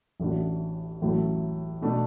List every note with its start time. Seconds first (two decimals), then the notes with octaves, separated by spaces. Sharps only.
0.20 A1 A2 A3 D4 F#4
1.02 A1 A2 F#3 A3
1.82 B2 A3 D4